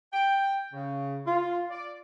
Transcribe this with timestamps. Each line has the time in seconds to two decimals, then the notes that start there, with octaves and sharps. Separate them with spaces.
0.13 G5
0.73 C#3
1.26 F4
1.71 D5